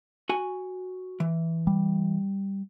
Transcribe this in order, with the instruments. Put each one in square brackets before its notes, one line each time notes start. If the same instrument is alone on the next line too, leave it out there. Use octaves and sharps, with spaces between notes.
[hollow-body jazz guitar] F#4 G#5
E3
[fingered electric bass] G3